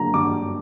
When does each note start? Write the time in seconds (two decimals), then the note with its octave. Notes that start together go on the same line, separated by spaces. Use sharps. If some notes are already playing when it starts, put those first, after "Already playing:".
Already playing: G2 D3 F#3 A#3 D4 A#5
0.14 G2 D6